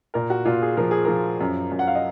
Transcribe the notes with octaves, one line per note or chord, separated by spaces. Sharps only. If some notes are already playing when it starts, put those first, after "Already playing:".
A#2 A#4
F#4
A#2 F4
G#4
F3 A#4
G#4
F3 A#4
F#2
F#2
F#5
F5
D#5